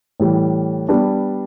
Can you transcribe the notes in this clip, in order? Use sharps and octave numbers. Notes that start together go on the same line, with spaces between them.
A2 E3 G3
G3 B3 D4